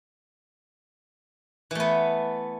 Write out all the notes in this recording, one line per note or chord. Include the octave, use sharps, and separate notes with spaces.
E3 A3 B3